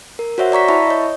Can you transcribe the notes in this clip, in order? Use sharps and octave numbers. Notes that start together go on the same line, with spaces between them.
A#4
F#4 C5 C#5 E5 F#5
D5 A#5 C#6 B6
E4 E5 A5 B5 C#6
C#5 D#5